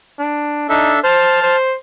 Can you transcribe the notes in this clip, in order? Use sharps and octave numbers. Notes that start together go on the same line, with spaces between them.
D4
D4 D#4 A4 E5
C5 A5 F6
C5